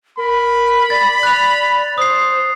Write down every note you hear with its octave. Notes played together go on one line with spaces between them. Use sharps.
A#4 B5
D5 A6
F#6 F7
C5 D#6 C7